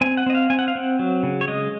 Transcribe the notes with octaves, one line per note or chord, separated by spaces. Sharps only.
C4 G#5
F#5
C4 D#5
F5
C4 G#5
F#5
F5
C4 F#5
F#3
C#3
C#5
G#3 D#5